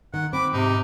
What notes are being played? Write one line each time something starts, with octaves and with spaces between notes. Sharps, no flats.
D#3 F#5
C4 B5 D6
G#2 C3 D#4